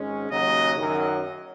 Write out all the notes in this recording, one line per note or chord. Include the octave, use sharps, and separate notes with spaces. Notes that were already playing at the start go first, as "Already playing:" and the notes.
Already playing: G#1 G#2 G#3 C#4
D#2 C#3 F#3 D#5
F#2 D#3 F#3